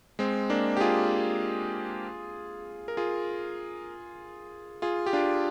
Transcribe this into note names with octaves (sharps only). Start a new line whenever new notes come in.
G#3 C4
A#3 D4
G4
F4 G#4
A#4
F4 G#4
F4 G#4
G4
D4 F4